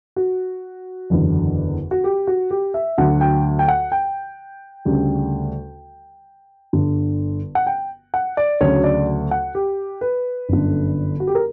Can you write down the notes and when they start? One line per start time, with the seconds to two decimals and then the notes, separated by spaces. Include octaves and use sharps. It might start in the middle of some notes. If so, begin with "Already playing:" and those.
0.16 F#4
1.10 F#1 E2 D3
1.91 F#4
2.04 G4
2.27 F#4
2.50 G4
2.74 E5
2.98 D2 D3 F#3 F#5
3.21 G5
3.59 G5
3.68 F#5
3.92 G5
4.85 D2 C#3 G3
6.73 G1 G2 D3
7.55 F#5
7.67 G5
8.14 F#5
8.37 D5
8.61 D2 C#3 F#3 C#5
8.84 D5
9.31 F#5
9.55 G4
10.01 B4
10.49 G1 F#2 D3
11.20 F#4
11.27 G4
11.35 A#4